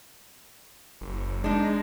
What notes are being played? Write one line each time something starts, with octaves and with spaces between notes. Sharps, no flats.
F#1
G#3 D4 D#4